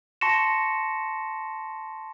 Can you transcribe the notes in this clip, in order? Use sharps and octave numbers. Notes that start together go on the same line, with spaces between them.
A5 C6 C#6 A#6 C#7 E7